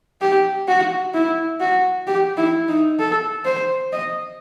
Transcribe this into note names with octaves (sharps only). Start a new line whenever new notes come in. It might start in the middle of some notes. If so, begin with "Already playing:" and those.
G4
F#4
E4
F#4
G4
E4
D#4
A4
C5
D#5